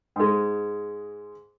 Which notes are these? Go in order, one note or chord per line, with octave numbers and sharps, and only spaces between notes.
G#2 G#3